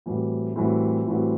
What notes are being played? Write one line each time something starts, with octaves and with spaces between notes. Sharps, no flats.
A2 E3 G3 C4 F#4
A2 E3 G3 C4 F#4
A2 E3 G3 C4 F#4